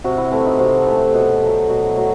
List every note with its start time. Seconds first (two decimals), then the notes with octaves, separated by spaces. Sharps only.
0.04 C3 F#4
0.17 E4
0.31 E3 A3 C4
0.46 D#4
0.59 C3 F#4
0.77 A4
0.86 E3 A3
0.96 G4
1.14 B2
1.41 F#3 A3
1.68 B2 F#4
1.87 E4
1.96 F#3 A3